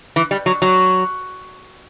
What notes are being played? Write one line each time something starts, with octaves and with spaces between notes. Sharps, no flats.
E3
G3
F#3
F#3